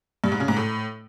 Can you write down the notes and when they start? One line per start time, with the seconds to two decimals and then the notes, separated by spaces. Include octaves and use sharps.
0.24 G2
0.32 G#2
0.40 C#3
0.48 G#2
0.56 A2